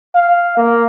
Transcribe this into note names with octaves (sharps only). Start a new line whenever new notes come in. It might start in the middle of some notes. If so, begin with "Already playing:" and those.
F5
A#3